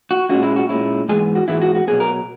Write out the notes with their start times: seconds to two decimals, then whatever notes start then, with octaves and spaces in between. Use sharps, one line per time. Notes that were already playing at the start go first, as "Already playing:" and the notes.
0.11 F#4
0.29 A#2 G#3 C#4 E4 F#4
0.43 E4
0.56 F#4
0.69 A#2 G#3 C#4 E4
1.09 G#2 E3 G#3 B3 G#4
1.35 F#4
1.48 G#2 E3 G#3 B3 E4
1.62 F#4
1.75 F#4
1.87 B2 F#3 B3 G#4
2.00 A#4